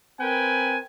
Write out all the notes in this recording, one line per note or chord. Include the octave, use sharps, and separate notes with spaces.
C4 A#4 B4 G5 G#5